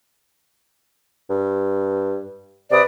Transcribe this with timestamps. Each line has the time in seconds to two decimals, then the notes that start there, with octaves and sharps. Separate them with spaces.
1.30 G2
2.71 C3 B4 D5 D#6